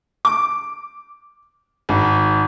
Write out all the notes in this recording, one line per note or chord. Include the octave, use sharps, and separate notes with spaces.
D6
G#1